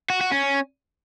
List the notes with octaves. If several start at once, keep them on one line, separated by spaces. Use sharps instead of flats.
F#4
F#4
C#4